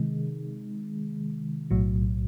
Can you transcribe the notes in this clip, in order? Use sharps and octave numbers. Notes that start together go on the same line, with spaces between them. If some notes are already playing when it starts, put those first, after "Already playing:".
Already playing: C3 D#3 G#3
B1 A2 F#3